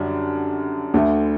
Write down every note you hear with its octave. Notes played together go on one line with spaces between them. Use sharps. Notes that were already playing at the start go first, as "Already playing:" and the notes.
Already playing: F#2 D3 G3 D4
D2 D3 A3